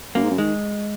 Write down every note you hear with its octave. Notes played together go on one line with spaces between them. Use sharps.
F#2 A#3
G#2
F#2
D#3 G#3